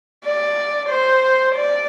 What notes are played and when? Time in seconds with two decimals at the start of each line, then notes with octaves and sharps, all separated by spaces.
0.25 D5
0.90 C5
1.55 D5